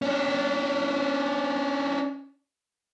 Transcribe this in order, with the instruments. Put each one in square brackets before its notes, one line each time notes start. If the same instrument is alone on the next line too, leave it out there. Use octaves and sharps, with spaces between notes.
[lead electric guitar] C#4 D4